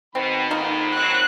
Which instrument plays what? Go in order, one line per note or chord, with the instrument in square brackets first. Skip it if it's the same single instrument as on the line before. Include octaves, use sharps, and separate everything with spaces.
[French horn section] B2 [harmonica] D#3 B5 [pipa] C4
[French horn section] F2 G#2 [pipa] A#3 D#4 F4
[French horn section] F#3 C4 [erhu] F#6